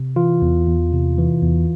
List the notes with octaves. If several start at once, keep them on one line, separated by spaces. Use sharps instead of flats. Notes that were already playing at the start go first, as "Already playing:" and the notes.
Already playing: C3
E3 F4
E2
E2
C3
E3
E2